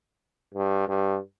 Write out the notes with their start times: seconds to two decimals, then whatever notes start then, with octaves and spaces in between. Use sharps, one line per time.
0.54 G2
0.88 G2